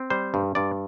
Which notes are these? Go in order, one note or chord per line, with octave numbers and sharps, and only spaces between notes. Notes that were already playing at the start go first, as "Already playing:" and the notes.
Already playing: C4
G3 C5
G2
G2 D5